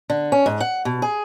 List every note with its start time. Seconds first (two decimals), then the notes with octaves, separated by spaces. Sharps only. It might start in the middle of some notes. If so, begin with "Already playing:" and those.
0.10 D3
0.32 C#4
0.46 G#2
0.60 F#5
0.85 B2
1.02 G#4